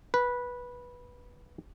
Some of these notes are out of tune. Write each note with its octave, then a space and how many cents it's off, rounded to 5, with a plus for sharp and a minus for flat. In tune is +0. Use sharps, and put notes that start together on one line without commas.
B4 -10